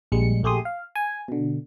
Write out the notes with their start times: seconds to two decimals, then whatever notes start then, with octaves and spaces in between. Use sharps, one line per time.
0.12 A#1 G3 G#3 C#7
0.43 A#1 A3 G4 G#4 C6 D#6
0.65 F5
0.95 G#5
1.28 B2 D3